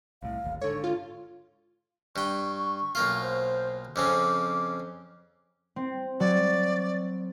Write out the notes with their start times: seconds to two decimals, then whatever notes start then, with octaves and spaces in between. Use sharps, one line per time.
0.23 C2 A2 F5
0.44 D1 G#1 D#2
0.61 G#2 D3 A4 C#5
0.84 F4
2.16 G2 G5 C#6
2.95 B1 A#3 F4
3.21 C5
3.96 F2 C#3 C4 D6
5.76 C4
6.20 F#3 D5